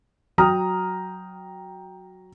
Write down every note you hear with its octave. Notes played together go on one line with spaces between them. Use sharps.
F#3 G5 A#5 D#6 F6